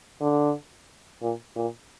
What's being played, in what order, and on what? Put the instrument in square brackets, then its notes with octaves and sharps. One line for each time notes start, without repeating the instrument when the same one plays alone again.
[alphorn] D3
A#2
A#2